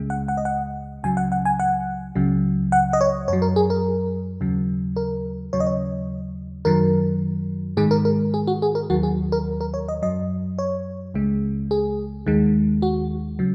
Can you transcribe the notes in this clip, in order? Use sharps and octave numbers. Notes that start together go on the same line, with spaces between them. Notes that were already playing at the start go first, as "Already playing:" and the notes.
Already playing: C#2 C#3 G#3
F#5
F#5
D#5
F#5
C#2 C#3 F#3 G#5
F#5
F#5
G#5
F#5
C#2 C#3 F#3
F#5
D#5
C#5
F#2 F#3 C#5
A#4
G#4
A#4
D#2 C#3 F#3
A#4
D#2 C#3 F#3 C#5
D#5
C#5
F#2 D#3 F#3 A#4
G#2 D#3 G#3 G#4
A#4
A#4
G#4
F#4
G#4
A#4
D#2 D#3 F#3 F#4
G#4
A#4
A#4
C#5
D#5
F#2 F#3 D#5
C#5
C#2 C#3 G#3
G#4
D#2 D#3 G#3
F#4
C#3 F#3